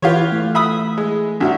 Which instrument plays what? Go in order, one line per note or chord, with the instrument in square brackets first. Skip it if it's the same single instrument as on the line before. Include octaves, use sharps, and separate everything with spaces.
[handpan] E3 B4 [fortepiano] F4 G4 C#5
[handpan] A3
[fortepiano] E5 B5 D#6
G#3
[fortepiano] C2 [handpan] D4 F#4 E5